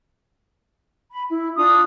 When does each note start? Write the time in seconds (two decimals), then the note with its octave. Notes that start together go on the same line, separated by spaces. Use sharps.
1.10 B5
1.29 E4
1.56 D4 F4 D#6